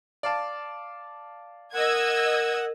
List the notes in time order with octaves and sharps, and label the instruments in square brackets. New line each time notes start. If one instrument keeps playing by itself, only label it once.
[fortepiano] D5 F5 A5
[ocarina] A#4 [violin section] D#5 E6 G#6 [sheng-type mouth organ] F#5